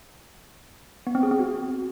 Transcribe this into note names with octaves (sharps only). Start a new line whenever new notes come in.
B3
C4
G#4
C4
F#4